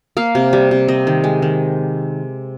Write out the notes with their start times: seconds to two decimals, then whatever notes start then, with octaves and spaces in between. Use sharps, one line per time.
0.17 A#3 F5
0.35 C3
0.53 G3
0.71 C3
0.88 C4 D#5
1.07 D#3
1.24 G#3
1.42 D#3